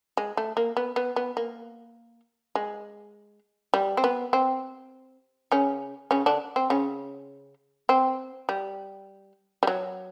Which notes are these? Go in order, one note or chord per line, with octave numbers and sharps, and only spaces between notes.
G#3
A3
A#3
B3
B3
B3
A#3
G#3
G3
C4
B3
C4
C#3 C#4
C#3 C#4
D3 D4
C4
C#3 C#4
C4
G3
G3
F#3